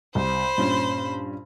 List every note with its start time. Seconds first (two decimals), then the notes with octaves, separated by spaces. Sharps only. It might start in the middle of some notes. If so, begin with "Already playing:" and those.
0.15 C2 C5 B5
0.58 G2 A#2 C#4